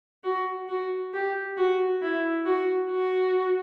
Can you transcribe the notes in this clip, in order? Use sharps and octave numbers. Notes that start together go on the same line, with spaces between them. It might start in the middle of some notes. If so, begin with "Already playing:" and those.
F#4
F#4
G4
F#4
E4
F#4
F#4